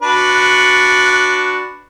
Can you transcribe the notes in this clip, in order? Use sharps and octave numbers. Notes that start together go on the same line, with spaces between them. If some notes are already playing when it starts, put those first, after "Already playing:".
D4 F#4 B4